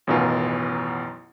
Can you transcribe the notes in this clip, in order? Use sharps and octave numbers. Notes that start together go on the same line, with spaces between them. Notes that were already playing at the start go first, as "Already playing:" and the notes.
A1 F#2 B2 D#3 F4 G#5